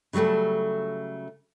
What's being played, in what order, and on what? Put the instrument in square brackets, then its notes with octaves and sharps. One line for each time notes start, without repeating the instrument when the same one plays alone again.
[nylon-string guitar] C#3 F#3 G3 A3 A4